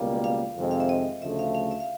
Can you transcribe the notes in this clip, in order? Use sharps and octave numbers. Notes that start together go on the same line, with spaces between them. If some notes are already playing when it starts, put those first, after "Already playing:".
Already playing: C#2 B2 G3 A#3
F5
F2 C3 D#3 G#3 C4
F5
E5
D#5
D2 C#3 F3 A3 E5
F5
F5
E5
F5